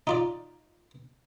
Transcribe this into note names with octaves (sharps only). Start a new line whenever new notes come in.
D#4 F4 D5